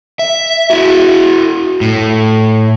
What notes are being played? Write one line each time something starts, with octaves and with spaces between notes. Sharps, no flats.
E5
E4 F#4
A2